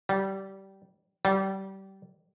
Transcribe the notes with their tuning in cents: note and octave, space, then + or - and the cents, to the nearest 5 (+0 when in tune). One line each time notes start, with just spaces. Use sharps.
G3 -20
G3 -25